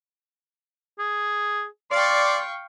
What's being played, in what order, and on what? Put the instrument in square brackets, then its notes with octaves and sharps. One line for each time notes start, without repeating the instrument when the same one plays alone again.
[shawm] G#4
[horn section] D5 [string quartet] F5 G5 C#6 [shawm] C6